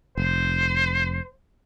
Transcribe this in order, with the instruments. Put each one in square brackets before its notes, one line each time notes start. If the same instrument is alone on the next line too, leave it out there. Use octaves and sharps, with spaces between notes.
[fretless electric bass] F1 [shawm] C5